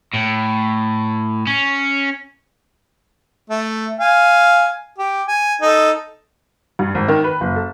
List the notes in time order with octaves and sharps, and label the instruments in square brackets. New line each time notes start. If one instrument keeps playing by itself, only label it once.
[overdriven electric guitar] A2
C#4
[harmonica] A3
F5 G#5
G4
G#5
D#4 A4
[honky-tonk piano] G2
G#1
D#3
B4
F#1
A4